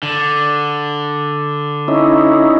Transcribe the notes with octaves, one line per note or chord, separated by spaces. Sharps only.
D3
C#4 D#4 E4